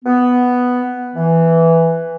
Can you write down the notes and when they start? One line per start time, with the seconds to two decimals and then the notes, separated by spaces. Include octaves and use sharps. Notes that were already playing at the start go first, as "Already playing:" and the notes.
0.05 B3
1.16 E3